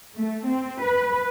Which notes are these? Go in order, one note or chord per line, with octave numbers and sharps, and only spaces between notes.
A3
C4
B4